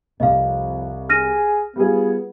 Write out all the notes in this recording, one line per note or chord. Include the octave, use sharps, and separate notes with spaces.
C2 F2 D#5 F5
G#4 F6 A#6 D#7
G3 B3 F4 G#4